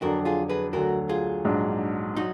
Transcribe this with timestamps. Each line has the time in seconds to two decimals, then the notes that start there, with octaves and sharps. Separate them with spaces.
0.02 F2 D3 F#3 D4 F#4 A#4
0.25 F4 G#4
0.49 G#4 B4
0.73 D2 D3 F#3 F#4 A#4
1.09 F4 G#4
1.44 A#1 G#2 F#3 D4
2.16 F#3 D#4 F#4